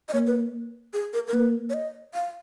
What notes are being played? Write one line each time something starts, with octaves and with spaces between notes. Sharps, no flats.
D#5
A#3 C#5
B4
G#4
A#4
A#4
A#3 B4
C#5
D#5
F5